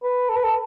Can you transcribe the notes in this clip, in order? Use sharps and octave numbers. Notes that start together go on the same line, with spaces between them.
B4
A4
B4
A4